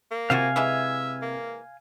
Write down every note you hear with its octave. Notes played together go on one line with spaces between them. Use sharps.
A#3
C3 C4 F4 F#4 F5 G#5
E3 G#3 E4 E5
A#3